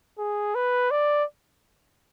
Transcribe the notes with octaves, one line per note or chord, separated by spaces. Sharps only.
G#4
B4
D5